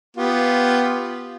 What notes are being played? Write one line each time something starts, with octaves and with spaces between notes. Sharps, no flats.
B3 F4 G4